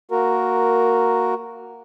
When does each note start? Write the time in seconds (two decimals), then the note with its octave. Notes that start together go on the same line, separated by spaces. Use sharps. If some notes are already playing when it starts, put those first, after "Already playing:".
0.11 A#3 F#4 A#4